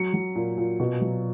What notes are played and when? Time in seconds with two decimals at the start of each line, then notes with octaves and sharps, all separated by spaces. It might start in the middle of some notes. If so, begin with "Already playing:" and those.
Already playing: F#3 C#7
0.14 F#3
0.35 A#2
0.57 A#2
0.80 B2
1.01 F#3